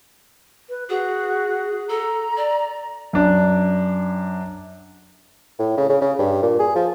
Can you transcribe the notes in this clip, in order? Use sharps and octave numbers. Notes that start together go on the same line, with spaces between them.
B4
F#4 G#4
A4 A#5
D5
F#2 D4
A2
C#3
C#3
C#3
G2
A#2
G#4
F3